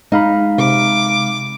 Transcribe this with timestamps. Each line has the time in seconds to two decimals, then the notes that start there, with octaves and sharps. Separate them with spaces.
0.12 G#3 D#4 F5 B5
0.58 C3 D6